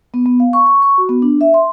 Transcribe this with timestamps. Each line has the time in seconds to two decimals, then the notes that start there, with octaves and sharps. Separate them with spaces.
0.14 B3
0.26 B3
0.40 F5
0.53 C#6
0.67 C#6
0.82 C#6
0.98 F#4
1.09 B3
1.22 D4
1.41 E5
1.54 C6